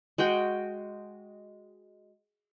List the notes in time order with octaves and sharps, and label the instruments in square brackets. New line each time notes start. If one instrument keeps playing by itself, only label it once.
[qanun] G#3 F#4 G5